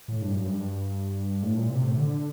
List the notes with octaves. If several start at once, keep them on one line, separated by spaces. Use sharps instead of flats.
A2
G2
F#2
G2
A2
A#2
C3
A2
D3